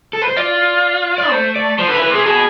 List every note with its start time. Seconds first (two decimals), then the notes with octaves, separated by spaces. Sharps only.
0.13 A4
0.22 B4
0.28 C5
0.37 F4 D5
1.18 D5
1.32 A3 C5
1.56 D5
1.78 F3 C5
1.88 D3
1.90 B4
1.94 E3
2.02 B4
2.10 C3 G#4
2.26 B2 G#4